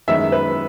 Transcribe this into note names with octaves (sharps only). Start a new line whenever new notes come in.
F#2 D#3 G#3 B3 E5
B4